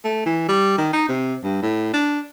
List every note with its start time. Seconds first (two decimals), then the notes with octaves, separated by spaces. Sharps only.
0.04 A3
0.26 E3
0.49 G3
0.78 D#3
0.93 D#4
1.09 C3
1.44 G2
1.63 A2
1.94 D4